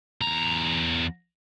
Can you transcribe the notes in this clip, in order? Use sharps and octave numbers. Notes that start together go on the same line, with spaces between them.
E2 A#5